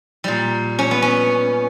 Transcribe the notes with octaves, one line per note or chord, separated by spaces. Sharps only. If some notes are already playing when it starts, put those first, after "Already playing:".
A#2 G3
C#4
B3
C#4